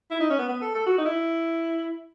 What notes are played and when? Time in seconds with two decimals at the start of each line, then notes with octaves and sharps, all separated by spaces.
0.11 E4
0.20 D#4
0.30 C#4
0.38 B3
0.49 B3
0.61 A4
0.74 A4
0.86 F#4
0.98 D#4
1.05 E4